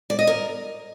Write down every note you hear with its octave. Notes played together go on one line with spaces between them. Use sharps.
D5
D#5
A#4